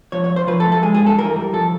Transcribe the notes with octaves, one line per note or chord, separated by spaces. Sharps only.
F3 C#5
C#5
F#2
C5
F3 B4
A4
A3
A4
G#3 G#4
G#4
G2
A4
E3 A#4
G3
F3 A4